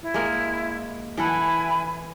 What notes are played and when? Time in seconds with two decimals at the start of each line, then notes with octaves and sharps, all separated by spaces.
0.02 E4
0.14 G#3 A#3
1.17 E3 E4 A4 F#5 G#5 B5